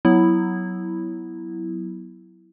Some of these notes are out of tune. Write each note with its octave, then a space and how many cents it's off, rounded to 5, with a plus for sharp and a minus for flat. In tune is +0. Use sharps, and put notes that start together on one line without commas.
F#3 +0 B3 +0 E4 -5